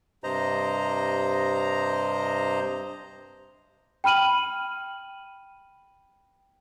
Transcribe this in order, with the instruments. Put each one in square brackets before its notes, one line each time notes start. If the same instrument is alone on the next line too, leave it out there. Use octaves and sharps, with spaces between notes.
[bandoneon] G2 C3 C5 D#5 A#5
[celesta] G5 B5 F6 D#7 F#7